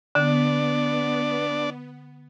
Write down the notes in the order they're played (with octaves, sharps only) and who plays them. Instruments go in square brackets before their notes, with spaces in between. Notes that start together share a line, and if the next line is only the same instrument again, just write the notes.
[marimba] D3 [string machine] B3 [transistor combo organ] D4 D5